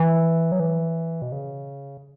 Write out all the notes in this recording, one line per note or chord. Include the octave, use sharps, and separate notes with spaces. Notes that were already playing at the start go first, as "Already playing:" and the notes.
Already playing: E3
F#3
E3
B2
C#3